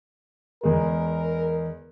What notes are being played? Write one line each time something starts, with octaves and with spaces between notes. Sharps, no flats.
E2 G#3 A#4